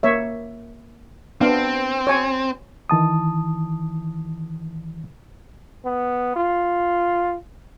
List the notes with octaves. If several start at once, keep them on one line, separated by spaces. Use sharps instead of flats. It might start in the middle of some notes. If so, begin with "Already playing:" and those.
A#3 C#5 E5
B3 C4 D4 F5
C#5 G#5
D#3 E3 A5 D#6
B3
F4